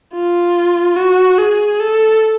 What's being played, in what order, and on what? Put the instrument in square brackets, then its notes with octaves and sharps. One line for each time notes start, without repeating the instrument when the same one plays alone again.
[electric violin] F4
F#4
G#4
A4